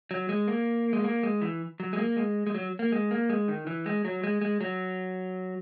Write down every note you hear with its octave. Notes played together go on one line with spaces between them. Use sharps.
F#3
G#3
A#3
G#3
A#3
G#3
E3
F#3
G#3
A#3
G#3
G#3
F#3
A#3
G#3
A#3
G#3
D#3
E3
G#3
F#3
G#3
G#3
F#3